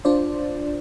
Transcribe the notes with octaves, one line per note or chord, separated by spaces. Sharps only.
D4 F4 C5 D5